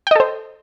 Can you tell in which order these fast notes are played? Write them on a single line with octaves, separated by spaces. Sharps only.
G5 D#5 A4 C5